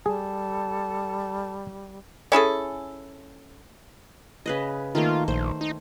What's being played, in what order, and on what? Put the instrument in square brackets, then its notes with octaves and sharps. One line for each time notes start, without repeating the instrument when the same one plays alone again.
[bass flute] G3 [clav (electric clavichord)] G#4 [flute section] A4 A5
[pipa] C#4 E4 G#4 A4
[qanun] C#3 B4 D#5
[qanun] D#3 A3 A#3 [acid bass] F4
[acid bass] A#1 [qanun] C5
[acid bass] D#4